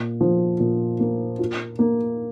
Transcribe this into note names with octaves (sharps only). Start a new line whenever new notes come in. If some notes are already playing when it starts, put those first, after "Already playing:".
Already playing: A#2
F3
A#2
A#3
F4
A#3